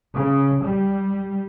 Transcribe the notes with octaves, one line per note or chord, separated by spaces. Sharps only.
C#3
G3